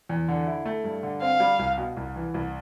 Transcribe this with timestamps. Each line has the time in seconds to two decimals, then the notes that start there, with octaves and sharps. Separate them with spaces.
0.09 E2
0.28 D3
0.47 E4
0.66 A3
0.84 G2
1.03 D3
1.22 C4 F5
1.40 G3
1.59 C2
1.78 B2
1.97 C2
2.16 E3
2.34 C2